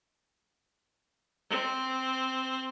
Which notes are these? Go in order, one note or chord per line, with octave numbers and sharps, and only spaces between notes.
C4